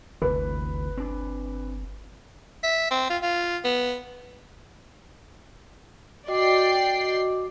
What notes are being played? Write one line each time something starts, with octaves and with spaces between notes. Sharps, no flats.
G1 D2 C3 E3 B4
C4 D4
E5
C4
F4
F4
B3
F#4 D5 D#5 G5 D6 C7